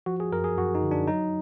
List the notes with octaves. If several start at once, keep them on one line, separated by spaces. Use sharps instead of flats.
F3 F#4
G#4
F#2 A#4
G#4
F#2 F#4
D#4
D3
D4
F#3 D#4